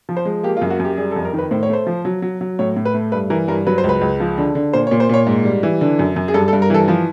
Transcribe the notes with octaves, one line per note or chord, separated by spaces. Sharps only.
F3
C5
G#3
A#3 G4
F4
F#2
F#4
F#2 G4
G3 G#4
A4
F2
A#4
D#3
B4
A2 C5
C#5
A3 C5
F3
F#3
F#3
F#3
A2 C#5
A2
B4
A3
G2 B4
E3 A#4
G2 A#4
F#3 B4
C5
C#2
B4
C#2
F3
D3
D3
A#2 C5
C#5
A#2
C5
A#2 C#5
G#2
G3
E3
D3
F#2
F#2
G#4
G2 A4
A4
G2
A#4
E3 A4
F3